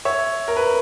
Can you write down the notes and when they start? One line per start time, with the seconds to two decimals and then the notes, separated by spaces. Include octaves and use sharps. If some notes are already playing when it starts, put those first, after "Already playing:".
0.05 C#5 E5
0.48 A#4
0.57 B4